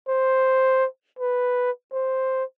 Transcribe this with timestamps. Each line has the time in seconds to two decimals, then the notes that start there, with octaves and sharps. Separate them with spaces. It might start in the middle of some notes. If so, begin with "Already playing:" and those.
0.08 C5
1.19 B4
1.92 C5